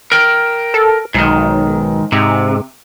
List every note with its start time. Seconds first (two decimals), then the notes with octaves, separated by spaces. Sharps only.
0.12 A#4 G5
0.74 A4
1.14 B1 G#2 D#3
2.12 G#2 C3